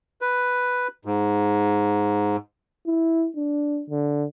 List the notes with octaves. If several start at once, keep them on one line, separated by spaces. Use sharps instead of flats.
B4
G#2
E4
D4
D3